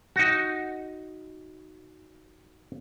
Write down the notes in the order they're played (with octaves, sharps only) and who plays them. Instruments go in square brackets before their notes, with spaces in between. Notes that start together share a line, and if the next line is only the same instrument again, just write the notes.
[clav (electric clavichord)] D#4 F#4